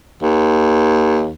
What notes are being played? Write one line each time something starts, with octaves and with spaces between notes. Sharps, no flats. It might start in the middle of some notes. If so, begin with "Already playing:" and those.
D#2